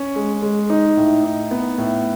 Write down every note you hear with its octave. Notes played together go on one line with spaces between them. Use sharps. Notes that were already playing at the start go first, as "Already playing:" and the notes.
Already playing: C#4
G#3
G#3
D#4
A2
D#4
B3
A2